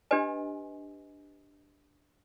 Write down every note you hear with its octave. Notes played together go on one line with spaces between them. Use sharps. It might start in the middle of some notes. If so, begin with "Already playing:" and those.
D4 G4 B4 D#5 G#5